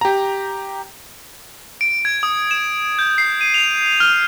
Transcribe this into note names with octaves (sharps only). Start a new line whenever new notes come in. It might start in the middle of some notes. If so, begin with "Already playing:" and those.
G4 A#5
D7
G#6
D#6
E7
G6
C7
D#7
F7
F6